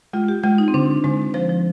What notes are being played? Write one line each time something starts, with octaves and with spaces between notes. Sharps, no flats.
G#3 F4
G4
G#3 F4
D#4
C4
D3 D4
D3 G#3
F3 C5
F3